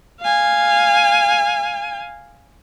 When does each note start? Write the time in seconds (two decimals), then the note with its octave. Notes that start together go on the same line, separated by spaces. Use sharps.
0.20 F5 G#5